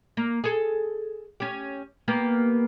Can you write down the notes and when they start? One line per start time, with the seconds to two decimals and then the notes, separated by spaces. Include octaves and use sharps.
0.17 A#3
0.44 G#4 A4
1.40 C#4 G4
2.08 A#3 B3 G4